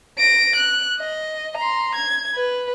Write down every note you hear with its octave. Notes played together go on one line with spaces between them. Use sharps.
A#6 D7
F#6
D#5
A#5 C6
G#6
B4